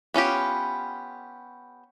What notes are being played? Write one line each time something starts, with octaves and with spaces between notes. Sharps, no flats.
B3 C#4 F4 G4